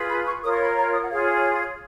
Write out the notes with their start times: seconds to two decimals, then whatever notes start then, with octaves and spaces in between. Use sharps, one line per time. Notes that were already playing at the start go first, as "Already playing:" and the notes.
Already playing: F4 G#4 B4
0.09 B5
0.26 C#6
0.43 F4 A#4 C#5 D#6
0.52 C#6
0.60 B5
0.76 A#5
0.93 D#6
1.02 F#5
1.09 F4 G#4 C#5 F5